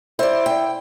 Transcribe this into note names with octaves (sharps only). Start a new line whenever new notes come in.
E4 C5 D5
G5